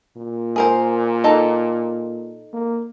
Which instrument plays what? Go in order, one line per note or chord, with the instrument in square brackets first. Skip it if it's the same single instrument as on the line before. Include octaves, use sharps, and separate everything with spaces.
[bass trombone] A#2
[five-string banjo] G#4 A#4 C5
D#4 A4
[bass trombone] A#3